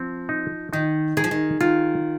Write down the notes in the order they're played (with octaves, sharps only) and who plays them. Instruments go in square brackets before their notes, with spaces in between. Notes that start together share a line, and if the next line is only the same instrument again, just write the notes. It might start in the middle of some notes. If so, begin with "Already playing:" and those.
Already playing: [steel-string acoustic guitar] F3 [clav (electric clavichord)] C4
[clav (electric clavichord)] D#4
[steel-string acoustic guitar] D#3 [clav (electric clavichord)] D#4
[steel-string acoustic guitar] D#3 [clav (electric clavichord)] G#4
[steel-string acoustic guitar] F3
D#3
[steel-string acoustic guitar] D#3 [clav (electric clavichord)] F4